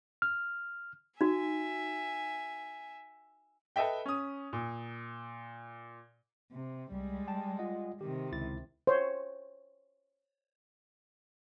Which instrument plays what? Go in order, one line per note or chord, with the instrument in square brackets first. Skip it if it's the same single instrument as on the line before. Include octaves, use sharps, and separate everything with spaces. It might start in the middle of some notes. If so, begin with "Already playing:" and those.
[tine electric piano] F6
[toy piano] D#4 F#4 [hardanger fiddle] E5 G#5
[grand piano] A4 B4 D#5 E5 G5
C#4 D#6
A#2
[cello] C3
[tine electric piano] C2 [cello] G3 G#3
[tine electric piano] G5 A5
F4 D#5 F#5
[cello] C3 D#3 [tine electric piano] G4
[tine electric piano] C#2 E4 A6
[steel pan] C5 C#5